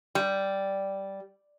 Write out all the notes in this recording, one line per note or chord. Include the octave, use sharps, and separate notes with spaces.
G3